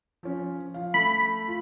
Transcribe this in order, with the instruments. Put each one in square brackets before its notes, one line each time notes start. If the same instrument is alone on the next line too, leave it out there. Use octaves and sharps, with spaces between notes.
[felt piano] F3 C#4
F3 F5
[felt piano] A3 [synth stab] B5
[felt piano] F4